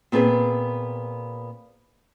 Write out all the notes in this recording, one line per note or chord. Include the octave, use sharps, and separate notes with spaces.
A#2 B3 C4 G#4 B4